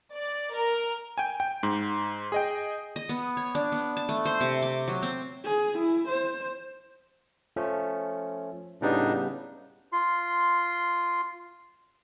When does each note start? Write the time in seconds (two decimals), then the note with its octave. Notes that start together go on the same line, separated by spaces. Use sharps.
0.13 D5
0.54 A#4
1.18 G5 G#5
1.40 G5
1.63 G#2
2.32 G#4 D#5 G5
2.96 D#5
3.09 B3
3.37 C#5
3.55 D4
3.72 B3
3.97 A5
4.09 A3
4.25 C5
4.41 C3
4.62 D6
4.88 F#3
5.03 C4
5.44 G#4
5.78 E4
6.08 C5
7.56 F3 A3 C#4
8.82 A2 C#3 G3 B3 D4 D#4
9.92 F4 C6